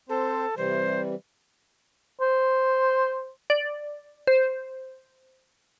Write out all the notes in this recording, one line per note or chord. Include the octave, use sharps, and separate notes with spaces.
C4 A4 C5
C3 E3 G3 C5
C5
D5
C5